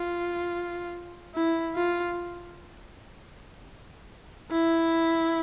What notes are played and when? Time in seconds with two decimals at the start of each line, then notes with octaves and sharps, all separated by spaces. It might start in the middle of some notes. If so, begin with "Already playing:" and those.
Already playing: F4
1.35 E4
1.75 F4
4.52 E4